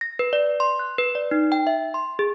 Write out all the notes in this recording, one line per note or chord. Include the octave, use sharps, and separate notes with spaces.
A#6
B4
D5
C6
F#6
B4
D5
D#4
G5
E5
C6
G#4